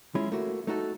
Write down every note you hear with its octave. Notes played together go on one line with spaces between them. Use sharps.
G#3 C#4 E4 F4
A3 A#3 F#4
A3 D#4 F#4 A4